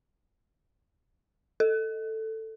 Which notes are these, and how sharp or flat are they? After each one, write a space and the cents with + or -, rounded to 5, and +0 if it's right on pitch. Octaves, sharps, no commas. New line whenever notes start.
A4 +10